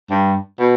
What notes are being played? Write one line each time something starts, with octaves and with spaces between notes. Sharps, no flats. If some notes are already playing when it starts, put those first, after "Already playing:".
G2
B2